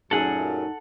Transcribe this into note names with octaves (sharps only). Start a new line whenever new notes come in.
F#2 A#2 A3 D#4 G#4 A4 F#5